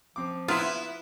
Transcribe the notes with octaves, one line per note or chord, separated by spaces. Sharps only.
F3 C4 D6
B3 E4 F4 B4 A#5 D#6